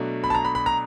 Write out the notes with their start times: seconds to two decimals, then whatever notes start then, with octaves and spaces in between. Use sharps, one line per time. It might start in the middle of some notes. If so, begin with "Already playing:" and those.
Already playing: B2 F#3 A3 D4
0.24 B5
0.30 A5
0.35 A#5
0.45 B5
0.55 B5
0.66 A#5